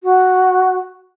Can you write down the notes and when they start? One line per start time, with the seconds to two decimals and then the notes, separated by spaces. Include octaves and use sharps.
0.03 F#4